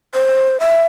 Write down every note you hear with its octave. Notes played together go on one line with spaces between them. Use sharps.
C5
E5